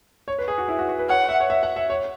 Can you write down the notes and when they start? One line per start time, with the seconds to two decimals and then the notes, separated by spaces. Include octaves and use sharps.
0.28 C#5
0.38 B4
0.48 G#4
0.58 F#4
0.68 E4
0.79 F#4
0.89 F#4
0.99 B4
1.09 C#5 F#5
1.29 E5
1.40 C#5
1.50 E5
1.63 F#5
1.76 E5
1.90 C#5